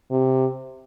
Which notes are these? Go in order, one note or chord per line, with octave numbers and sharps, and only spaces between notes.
C3